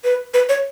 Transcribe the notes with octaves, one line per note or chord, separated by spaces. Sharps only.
B4
B4
C#5